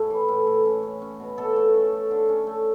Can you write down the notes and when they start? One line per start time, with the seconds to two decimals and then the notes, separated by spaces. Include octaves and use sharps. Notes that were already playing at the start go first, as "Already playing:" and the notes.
Already playing: A2 A3 C#4
0.10 E3
0.28 A2
0.47 A2
0.65 C#4
0.83 C#4
1.02 C#4
1.20 B2
1.38 B2 A4
1.56 A3
1.74 C#4
1.92 A3
2.11 D3
2.29 C#4
2.47 A3